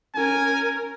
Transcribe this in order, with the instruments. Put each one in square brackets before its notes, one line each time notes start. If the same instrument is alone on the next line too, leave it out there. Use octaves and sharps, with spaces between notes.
[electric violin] C#4 A#4 [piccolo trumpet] G#5